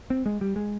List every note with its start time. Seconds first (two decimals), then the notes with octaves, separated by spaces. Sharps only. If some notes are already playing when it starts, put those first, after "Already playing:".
0.10 C4
0.26 G#3
0.41 G3
0.56 G#3